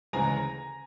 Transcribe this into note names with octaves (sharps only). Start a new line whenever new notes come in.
D2 C#3 E3 G#3 G#5 A#5